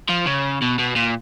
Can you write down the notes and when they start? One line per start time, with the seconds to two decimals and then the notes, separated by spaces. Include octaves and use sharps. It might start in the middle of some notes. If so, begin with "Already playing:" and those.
0.09 F3
0.26 C#3
0.62 B2
0.79 B2
0.96 A#2